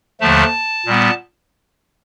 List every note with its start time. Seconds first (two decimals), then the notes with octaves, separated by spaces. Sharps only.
0.21 D#2 D3 F3 A3 A5
0.86 A#2 G3 B3